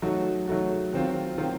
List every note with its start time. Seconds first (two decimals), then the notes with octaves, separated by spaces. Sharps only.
0.02 F#3 A3 D#4 F#4
0.47 F#3 A3 D#4 F#4
0.93 D#3 F#3 C4 F4
1.38 D#3 F#3 C4 F4